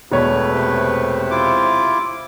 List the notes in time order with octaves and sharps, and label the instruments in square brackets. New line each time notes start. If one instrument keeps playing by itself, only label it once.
[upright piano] E1 C#5 [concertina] A3 B4
[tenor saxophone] C3
[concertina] E4 F4 D6